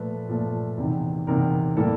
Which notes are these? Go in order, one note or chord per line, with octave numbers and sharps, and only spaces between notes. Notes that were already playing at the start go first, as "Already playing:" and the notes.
Already playing: A#2 F3 A3 B4
A#2 F3 A3
E2 C3 D#3
E2 C3 D#3 A#4
A2 E3 G3 A#3 A4